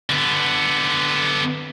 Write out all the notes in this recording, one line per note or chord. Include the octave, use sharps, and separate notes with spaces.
D3 B3